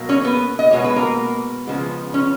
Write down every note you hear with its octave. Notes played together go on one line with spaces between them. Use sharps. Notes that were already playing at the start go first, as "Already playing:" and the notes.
Already playing: B2 F#3 A#3
C#4 C#5
B3 B4
D#5
B2 G#3 B3 C#5
B4
A#3 A#4
C#3 F3 G#3 B3
C#4 C#5